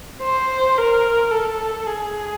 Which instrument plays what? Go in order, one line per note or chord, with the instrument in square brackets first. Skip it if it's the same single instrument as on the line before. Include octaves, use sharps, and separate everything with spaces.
[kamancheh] C5
A#4
A4
G#4